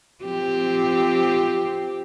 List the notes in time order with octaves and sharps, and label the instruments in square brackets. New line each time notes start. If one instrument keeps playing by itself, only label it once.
[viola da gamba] F3 C4 G4